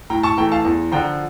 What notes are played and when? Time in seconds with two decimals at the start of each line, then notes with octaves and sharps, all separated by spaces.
0.10 A2 G5 A#5
0.23 A5 C#6
0.37 E3 A3 G5 A#5
0.52 F5 A5
0.65 E2
0.92 D3 F3 G5 A#5